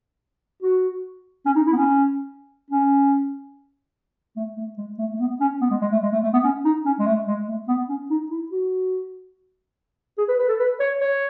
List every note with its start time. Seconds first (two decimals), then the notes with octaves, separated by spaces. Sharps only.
0.62 F#4
1.45 C#4
1.56 D#4
1.66 E4
1.72 B3
1.76 C#4
2.70 C#4
4.36 A3
4.57 A3
4.77 G#3
4.98 A3
5.13 A3
5.19 B3
5.40 C#4
5.61 B3
5.70 G#3
5.81 G#3
5.91 A3
6.02 G#3
6.12 A3
6.23 A3
6.33 B3
6.44 C#4
6.64 D#4
6.85 C#4
6.99 G#3
7.06 A3
7.27 G#3
7.48 A3
7.68 B3
7.89 C#4
8.10 D#4
8.30 E4
8.51 F#4
10.18 G#4
10.28 B4
10.39 B4
10.48 A4
10.59 B4
10.80 C#5
11.01 C#5